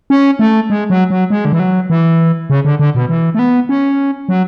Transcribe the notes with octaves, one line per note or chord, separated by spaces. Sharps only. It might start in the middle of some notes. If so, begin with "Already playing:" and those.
C#4
A3
G#3
F#3
F#3
G#3
D3
E3
F#3
E3
C#3
D3
D3
B2
E3
A3
B3
C#4
F#3